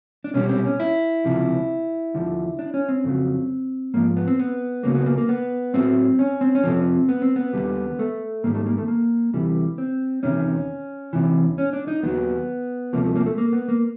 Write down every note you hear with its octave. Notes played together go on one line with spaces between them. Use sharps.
D4
C2 B2 G3 C#4
C4
C#4
E4
C#2 C3 F3
D#2 D3 F3
D4
C#4
C4
F2 C#3 F#3
G#2 F3 A#3
B3
C4
B3
C#2 C#3 F#3 A#3
B3
A#3
A#3
B3
A2 F#3 C4
C#4
C4
C#4
F2 C3 F3 C4
B3
C4
B3
D#2 D3 G3
A3
G#2 D#3 G3 A#3
A3
A#3
A3
A#3
D2 C3 E3 G3
C4
E2 C3 D#3 C#4
E2 C3 E3
C#4
D4
D#4
D#2 D#3 F#3 B3
D2 C3 F3 A#3
A3
A#3
A3
A#3
B3
A#3